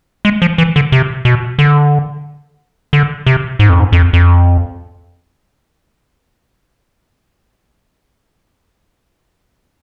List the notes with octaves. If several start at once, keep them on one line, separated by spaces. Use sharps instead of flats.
G#3
F3
E3
D3
C3
B2
D3
D3
C3
G#2
F2
G#2
F2
F2